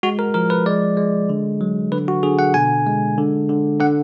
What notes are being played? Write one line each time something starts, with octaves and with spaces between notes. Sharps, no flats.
G#3 F#4
A#4
F3 A#4
B4
G#3 D5
G#3
D3
F#3
D3 B4
F#4
D3 G#4
F#5
B2 G#5
G#3
D3
D3
D3 F#5